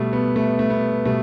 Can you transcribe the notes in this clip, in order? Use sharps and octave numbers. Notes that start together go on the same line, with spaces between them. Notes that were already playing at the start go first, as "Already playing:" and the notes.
Already playing: B2 G3 A3
B3
A3
A3
B3
B2 G3 A3